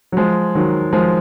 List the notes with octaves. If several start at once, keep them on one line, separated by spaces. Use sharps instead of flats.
F#3
F3 G#3
D#3 F#3
F3 G#3